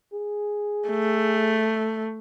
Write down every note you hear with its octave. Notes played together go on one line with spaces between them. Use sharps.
G#4
A3